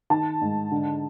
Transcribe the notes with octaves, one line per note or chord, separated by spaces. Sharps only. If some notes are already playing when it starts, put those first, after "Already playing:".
D#3 A5
G#2
D3